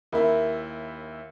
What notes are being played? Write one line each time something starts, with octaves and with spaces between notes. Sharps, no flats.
D#2 E4 A#4 E5 B5